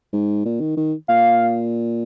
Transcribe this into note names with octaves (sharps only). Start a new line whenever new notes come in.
G#2
A#2
D#3
D#3
A#2 F5